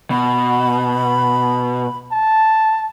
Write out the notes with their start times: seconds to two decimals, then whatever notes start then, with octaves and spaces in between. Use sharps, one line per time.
0.11 B2 B5
2.12 A5